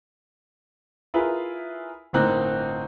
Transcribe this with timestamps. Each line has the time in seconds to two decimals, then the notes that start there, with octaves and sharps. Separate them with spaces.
1.14 E4 F4 G#4 A#4 B4
2.13 G1 A2 A#3 C4 D#4 F#6